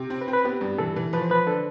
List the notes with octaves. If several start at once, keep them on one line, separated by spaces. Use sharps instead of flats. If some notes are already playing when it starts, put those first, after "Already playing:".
Already playing: C3
C4
B4
C4
B4
B3 G4
G2
E3 A4
E3
F3 B4
C5
F3 B4
D3 A4